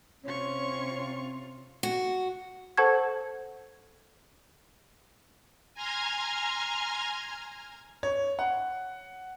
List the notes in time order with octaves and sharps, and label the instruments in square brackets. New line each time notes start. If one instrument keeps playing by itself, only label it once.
[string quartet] C3 F4 [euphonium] C4 [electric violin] C#4 C#6 [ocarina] C#5
[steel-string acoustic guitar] F#4
[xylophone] A4 C5 F#5 A5 C#6 G#6
[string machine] G#5 A#5 C6 F6 G#6
[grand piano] C#5
F#5